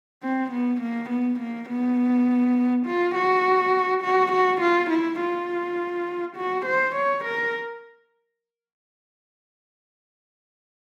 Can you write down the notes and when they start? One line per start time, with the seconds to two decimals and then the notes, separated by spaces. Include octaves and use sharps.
0.23 C4
0.52 B3
0.81 A#3
1.10 B3
1.40 A#3
1.69 B3
2.86 F4
3.15 F#4
4.03 F#4
4.32 F#4
4.61 F4
4.90 E4
5.20 F4
6.36 F#4
6.66 C5
6.95 C#5
7.25 A#4